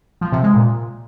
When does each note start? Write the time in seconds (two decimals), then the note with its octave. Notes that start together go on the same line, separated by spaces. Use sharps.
0.21 F3
0.32 C3
0.43 G#3
0.54 A#2